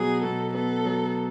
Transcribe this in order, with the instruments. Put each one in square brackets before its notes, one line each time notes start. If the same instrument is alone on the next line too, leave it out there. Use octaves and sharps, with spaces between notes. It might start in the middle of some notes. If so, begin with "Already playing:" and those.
Already playing: [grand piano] B2 F#3 B3 [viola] G#4
[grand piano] B2 [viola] A4
[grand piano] B3 [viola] A4
[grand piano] F#3